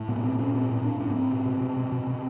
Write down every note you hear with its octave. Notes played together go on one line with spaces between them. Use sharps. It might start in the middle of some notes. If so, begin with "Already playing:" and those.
Already playing: A2
A#2 B3
A#2 C4
A#2 C#4
A#2 C4
A2 C4
A2 D4
A2 C#4
B3
A2 C4
B2
B2
B2
B2
B2
B2